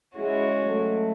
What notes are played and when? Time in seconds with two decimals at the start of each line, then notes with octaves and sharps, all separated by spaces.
0.15 G#3 C#4 E4 F#4 G#4
0.62 F#3 A3